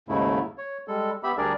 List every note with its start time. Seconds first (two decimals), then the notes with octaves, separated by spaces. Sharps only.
0.09 D#2 G#2 C#3 A3 E4
0.58 C#5
0.88 G3 G#3 A4
1.23 B3 G4 E5 B5
1.38 D2 G3 D4 G#4 A#4 D5